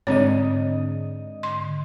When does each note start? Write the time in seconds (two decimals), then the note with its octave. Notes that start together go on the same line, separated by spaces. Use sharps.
0.07 G#2 D3 C4 C#5 D#5
1.43 C6